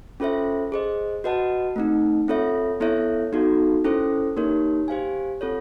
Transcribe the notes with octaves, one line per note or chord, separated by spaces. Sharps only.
C#4 F4 A4 C5 E5
G#4 C5 D#5
F#4 B4 D#5 F#5 A5
A3 C4 D#4
C4 F4 A4 C#5 E5
B3 E4 A4 C#5 E5
B3 D#4 F#4 A4
C#4 E4 A4 C5
A#3 D#4 G4 A#4 C#5
G4 C5 F5 G#5
C4 F4 A4 C#5